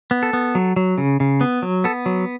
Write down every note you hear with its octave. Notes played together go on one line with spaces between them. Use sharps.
B3
A4
B3
F#3
F#3
C#3
C#3
B3
F#3
B3 A4
F#3